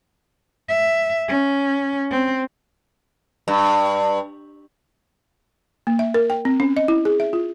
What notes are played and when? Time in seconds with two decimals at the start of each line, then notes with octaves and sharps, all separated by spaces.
0.69 E5
1.28 C#4
2.11 C4
3.48 G2
5.87 A#3
5.99 E5
6.14 A#4
6.30 G5
6.45 C4
6.60 C#4
6.77 D#5
6.88 E4
7.05 G#4
7.20 E5
7.33 F4